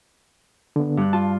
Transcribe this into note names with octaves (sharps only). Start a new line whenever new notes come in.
D3 B3
G2 F#6
F4 A5